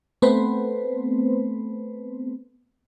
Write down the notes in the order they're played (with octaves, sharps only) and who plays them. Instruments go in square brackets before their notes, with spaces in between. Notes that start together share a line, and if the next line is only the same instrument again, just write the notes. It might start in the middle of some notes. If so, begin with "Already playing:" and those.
[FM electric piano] A3 B3 C4 B4 C5